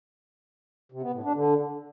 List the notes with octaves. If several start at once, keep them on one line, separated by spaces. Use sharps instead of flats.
C3
B3
A2
D4
D3